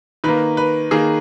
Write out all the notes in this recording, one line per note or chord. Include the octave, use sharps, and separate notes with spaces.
D#3 A#3 B4
B4
D#3 A#3 G#4